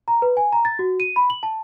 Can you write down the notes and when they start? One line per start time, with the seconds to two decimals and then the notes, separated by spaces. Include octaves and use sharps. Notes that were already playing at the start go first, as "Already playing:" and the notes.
0.08 A#5
0.22 B4
0.37 G#5
0.52 A#5
0.65 A6
0.79 F#4
1.00 D#7
1.16 B5
1.30 F#7
1.43 A5